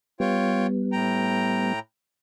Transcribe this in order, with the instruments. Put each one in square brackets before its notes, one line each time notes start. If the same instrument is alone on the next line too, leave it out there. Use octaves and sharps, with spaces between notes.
[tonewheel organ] G3 B3 [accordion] F4 C#5 G5
[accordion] A2 G5 A#5